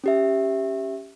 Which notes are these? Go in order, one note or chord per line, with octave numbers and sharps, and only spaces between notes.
C#4 G4 E5